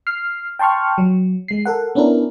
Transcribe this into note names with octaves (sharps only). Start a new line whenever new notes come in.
F6 C7
G5 A5 C6 C#6 F6
F#3
G#3 C7
A4 A#4 F#5
B3 C#4 D4 E4 A#4